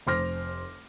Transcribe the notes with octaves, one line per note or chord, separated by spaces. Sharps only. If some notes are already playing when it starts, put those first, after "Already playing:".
F1 C5 C6 D6 F6 A#6